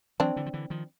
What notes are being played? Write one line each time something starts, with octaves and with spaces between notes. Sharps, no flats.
E3 F#3 C4 D4
D3 E3
F3
D3 E3
D#3 F3